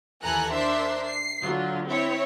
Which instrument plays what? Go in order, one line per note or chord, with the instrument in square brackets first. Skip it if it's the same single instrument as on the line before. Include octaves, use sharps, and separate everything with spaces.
[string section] D#2 E3 A4 G#5 A#5 F#6
D4 A#4 C5 E5 C6
C7
D3 F#3 F4
C4 E4 C#5 E5